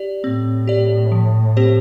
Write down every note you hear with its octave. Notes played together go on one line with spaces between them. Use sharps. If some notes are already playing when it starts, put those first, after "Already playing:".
Already playing: G4 D5
A2 C4
G4 D5
F3
C4 G4 C5